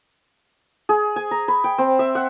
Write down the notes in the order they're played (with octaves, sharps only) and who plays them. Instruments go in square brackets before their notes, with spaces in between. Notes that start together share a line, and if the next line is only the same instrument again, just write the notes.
[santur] G#4
G#5
A#5
B5
G5
C4
E5
F#5